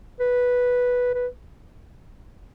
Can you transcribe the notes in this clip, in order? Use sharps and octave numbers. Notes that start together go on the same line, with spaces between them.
B4
B4